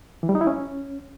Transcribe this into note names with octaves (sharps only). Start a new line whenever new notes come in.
E3
G3
D#4
E4
C#4